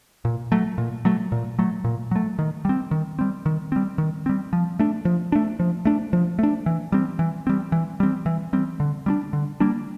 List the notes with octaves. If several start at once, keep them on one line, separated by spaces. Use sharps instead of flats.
A#2
F#3 A3
A#2
F#3 A3
A#2
F#3 A3
A#2
F#3 A3
D#3
G3 C4
D#3
G3 C4
D#3
G3 C4
D#3
G3 C4
F3
A3 D4
F3
A3 D4
F3
A3 D4
F3
A3 D4
E3
G3 C4
E3
G3 C4
E3
G3 C4
E3
G3 C4
D3
G3 A#3 D4
D3
G3 A#3 D4